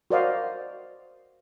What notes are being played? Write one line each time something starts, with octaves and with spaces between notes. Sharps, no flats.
F#4 A#4 C5 D5 D#5 F5